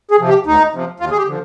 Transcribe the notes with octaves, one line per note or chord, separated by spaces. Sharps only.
G#4
C3 F3
G4
D2 D#4
C3 F3
D#2 F4
G#4
G4
D3 F3